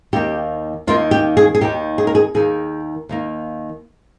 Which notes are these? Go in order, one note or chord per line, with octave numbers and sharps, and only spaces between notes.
D#2 D#3 A#3 G4
D#2 D#3 A#3 F4
G4
G#4
G#4
D#2 D#3 A#3 G4
G#4
A#4
G#4
D#2 D#3 A#3 G#4
D#2 D#3 A#3